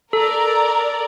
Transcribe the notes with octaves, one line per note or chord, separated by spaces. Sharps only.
A4 A#4 D5 A#5